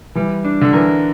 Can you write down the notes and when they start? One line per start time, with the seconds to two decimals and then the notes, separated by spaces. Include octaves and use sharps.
0.15 E3 G3
0.45 D4
0.61 D3
0.73 E3 A#4